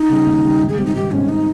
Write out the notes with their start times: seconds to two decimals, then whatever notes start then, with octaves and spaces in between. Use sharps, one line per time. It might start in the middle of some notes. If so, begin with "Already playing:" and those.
Already playing: D#4
0.09 C#3 G3
0.26 D#2
0.43 C#3 G3
0.60 G#1
0.69 G#4
0.78 G#2 G3 C4 G4
0.86 D#4
0.95 G#1 G4
1.11 G#2 G3 C4 C#4
1.29 D#4